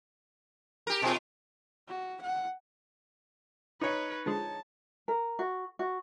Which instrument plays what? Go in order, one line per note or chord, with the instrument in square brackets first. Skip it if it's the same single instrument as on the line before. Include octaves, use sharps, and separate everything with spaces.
[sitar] G4 A#4
[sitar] B2 F4 [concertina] C4 G#4 A5
[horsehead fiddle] F#4
F#5
[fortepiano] D#4 C#5 [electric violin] B4
[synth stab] D3 F3 G#3 [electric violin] A5
[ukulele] A#4
F#4
F#4